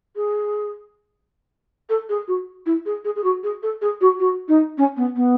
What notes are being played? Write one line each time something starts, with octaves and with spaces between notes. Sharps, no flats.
G#4
A4
G#4
F#4
E4
G#4
G#4
G#4
F#4
G#4
A4
G#4
F#4
F#4
D#4
C#4
B3
B3